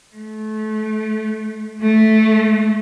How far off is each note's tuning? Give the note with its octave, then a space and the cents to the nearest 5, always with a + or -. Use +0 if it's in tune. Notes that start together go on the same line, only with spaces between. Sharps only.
A3 -25
A3 -10